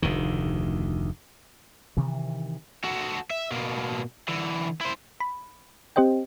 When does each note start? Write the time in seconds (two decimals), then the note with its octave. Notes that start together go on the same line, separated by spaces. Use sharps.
0.02 F1 D2 D#3
1.97 C3 D#3 E3
2.84 F#4 A4
3.30 E5
3.52 B2 A#3
4.28 D3 E3
4.81 E4 C5
5.20 B5
5.96 C4 G4 C5 D#5 G5